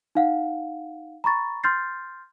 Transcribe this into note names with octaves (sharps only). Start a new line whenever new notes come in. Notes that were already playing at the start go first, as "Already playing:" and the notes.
D#4 F5 F#5
A#5 B5 C#6 A6
C6 F6 G6 A6 C7